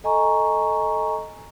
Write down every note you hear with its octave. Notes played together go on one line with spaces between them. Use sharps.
A4 D#5 G#5 A#5 C#6